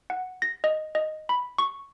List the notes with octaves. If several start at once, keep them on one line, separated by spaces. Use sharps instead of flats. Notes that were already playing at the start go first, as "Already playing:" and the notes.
F#5
A#6
D#5
D#5
B5
C#6